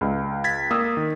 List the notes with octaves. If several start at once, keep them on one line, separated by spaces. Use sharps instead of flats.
C#2
G#6 A6 B6
A#3 D#6 E6
D#3